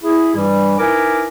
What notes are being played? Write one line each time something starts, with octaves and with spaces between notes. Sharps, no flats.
E4 G#4
G2 E3 G3
D#4 E4 A#4 B4 G#5 D6